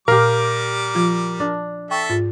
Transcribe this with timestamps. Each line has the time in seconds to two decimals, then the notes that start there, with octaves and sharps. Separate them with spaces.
0.08 A#2 G3 G4 A#4 F5 D6
0.95 F3 F4
1.40 D4
1.91 A4 E5 G5 A5 C#6
2.10 G#2 F4 A6